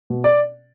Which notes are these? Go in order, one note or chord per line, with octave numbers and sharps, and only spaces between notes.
B2
D5